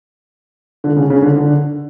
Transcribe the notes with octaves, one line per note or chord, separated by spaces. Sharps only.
D3
C#3
C#3
D3
D3